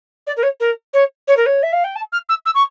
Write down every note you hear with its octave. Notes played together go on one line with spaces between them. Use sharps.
D5
A#4
C#5
A#4
C#5
C#5
A#4
C#5
E5
F5
G5
A5
F6
E6
E6
C#6